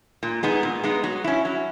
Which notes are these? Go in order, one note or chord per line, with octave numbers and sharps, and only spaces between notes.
A#2
G#3 B3 D#4
A#2
G#3 B3 D#4
F#3
C#4 E4
F#3